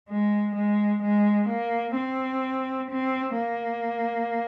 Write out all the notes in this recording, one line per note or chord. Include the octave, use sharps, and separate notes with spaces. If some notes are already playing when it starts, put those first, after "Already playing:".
G#3
G#3
G#3
A#3
C4
C4
A#3